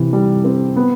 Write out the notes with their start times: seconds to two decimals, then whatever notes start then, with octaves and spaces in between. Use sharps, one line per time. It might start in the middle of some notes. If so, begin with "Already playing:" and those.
Already playing: C3 E3
0.13 G3
0.44 C4
0.76 B3